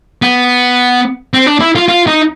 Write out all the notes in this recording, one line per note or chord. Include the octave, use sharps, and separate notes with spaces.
B3
C4
D4
E4
F4
F4
D#4